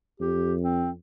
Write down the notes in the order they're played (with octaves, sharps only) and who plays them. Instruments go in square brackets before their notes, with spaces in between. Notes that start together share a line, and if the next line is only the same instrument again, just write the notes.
[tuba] F2 [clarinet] G4
[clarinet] C4